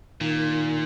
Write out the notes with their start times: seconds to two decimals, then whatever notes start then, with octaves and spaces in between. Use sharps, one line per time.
0.21 A#2 D#3